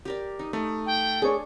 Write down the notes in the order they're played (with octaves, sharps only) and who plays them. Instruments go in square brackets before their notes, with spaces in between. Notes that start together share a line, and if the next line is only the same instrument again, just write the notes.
[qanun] G4 A#4 D5
D#4
[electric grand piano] A3 [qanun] D#4
[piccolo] G5
[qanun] D4 [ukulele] G#4 C#5